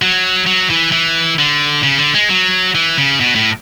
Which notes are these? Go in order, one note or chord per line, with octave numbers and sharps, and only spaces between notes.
F#3
F#3
E3
E3
D3
C#3
D3
G#3
F#3
E3
C#3
B2
A2